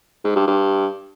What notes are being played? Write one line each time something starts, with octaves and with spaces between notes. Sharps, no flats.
G#2
G2
G2